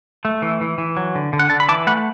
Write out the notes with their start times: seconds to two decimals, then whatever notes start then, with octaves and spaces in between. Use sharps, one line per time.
0.25 A3
0.42 E3
0.61 E3
0.78 E3
0.97 F#3
1.15 D3
1.33 D3
1.39 F#5
1.50 D3 A5
1.60 B5
1.69 E3 A5 D6
1.87 A3 F#5 B5